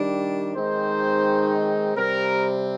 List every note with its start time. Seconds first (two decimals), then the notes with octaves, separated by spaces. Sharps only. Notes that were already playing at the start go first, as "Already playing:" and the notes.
Already playing: D#3 G3 D4
0.57 D#3 G#3 C4 D#4 C5
1.96 C3 G3 C4 A#4